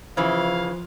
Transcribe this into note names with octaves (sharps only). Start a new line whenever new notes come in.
C#3 E3 F3 C5 F5